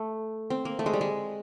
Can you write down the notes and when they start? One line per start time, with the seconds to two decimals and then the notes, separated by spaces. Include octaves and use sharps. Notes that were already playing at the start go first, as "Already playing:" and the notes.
Already playing: A3
0.50 C4
0.65 A#3
0.79 A3
0.86 G#3
0.93 G3
1.01 G#3